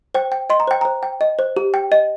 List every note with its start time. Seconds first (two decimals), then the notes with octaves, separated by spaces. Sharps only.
0.14 C5 G5
0.32 G5
0.50 D#5 C6
0.60 A#5
0.67 C5 G5
0.81 C5 A#5
1.03 G5
1.21 D#5
1.39 C5
1.56 G4
1.74 G5
1.92 D#5